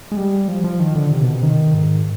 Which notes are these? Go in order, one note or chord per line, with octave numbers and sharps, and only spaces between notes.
G#3
G3
F3
F3
D#3
D3
C3
B2
C3
D#3
G#2